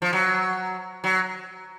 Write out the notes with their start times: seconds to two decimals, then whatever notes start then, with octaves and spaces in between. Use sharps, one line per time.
0.02 F3
0.13 F#3
1.04 F#3